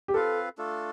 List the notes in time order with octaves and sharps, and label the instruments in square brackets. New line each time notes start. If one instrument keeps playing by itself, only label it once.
[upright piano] G4
[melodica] C4 F4 B4 F5 [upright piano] A4
[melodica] A3 D4 F4 A4